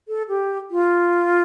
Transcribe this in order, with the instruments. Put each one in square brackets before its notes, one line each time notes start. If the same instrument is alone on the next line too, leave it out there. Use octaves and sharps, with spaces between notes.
[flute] A4
G4
F4